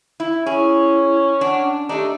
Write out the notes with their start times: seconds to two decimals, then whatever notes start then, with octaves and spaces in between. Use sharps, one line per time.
0.20 E4
0.46 C#4 E4 G#4
1.41 D4 F#5
1.89 A3 D4 D#4 G4